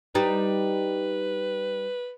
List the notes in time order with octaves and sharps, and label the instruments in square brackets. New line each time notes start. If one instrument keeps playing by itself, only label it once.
[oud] G3 D#4 [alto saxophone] B4